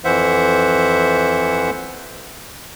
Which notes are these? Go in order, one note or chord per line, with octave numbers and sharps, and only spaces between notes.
F2 E3 C5 E5 F#5